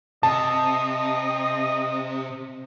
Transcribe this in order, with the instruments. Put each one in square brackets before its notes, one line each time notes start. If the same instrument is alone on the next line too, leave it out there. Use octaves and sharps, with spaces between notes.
[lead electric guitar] C3 [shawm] D#5 [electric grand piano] A5